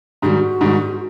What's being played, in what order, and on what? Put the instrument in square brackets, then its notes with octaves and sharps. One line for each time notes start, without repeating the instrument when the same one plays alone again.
[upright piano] G#2 D#3 G3 [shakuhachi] F#4 G4
[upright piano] G#2 D#3 G3